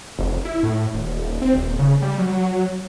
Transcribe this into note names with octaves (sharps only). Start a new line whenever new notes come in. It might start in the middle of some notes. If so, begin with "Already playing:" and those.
F1
E4
A2
D#1
C4
D#1
C#3
G3
F#3